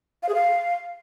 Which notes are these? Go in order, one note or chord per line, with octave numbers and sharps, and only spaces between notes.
F5
G#4
F5